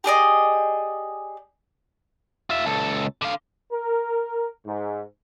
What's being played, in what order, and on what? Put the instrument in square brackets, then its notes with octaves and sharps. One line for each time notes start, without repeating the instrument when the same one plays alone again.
[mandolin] G4 G#4 D5 D#5
[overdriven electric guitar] F4 E5
C#2 A4
D3 F5
[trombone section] A#4
G#2